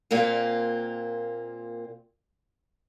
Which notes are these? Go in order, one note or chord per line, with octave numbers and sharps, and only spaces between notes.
A#2 A#3 C4 F4